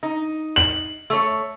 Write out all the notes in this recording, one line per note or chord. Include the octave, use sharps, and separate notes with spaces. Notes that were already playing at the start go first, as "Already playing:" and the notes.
D#4
F#7
A3 C#5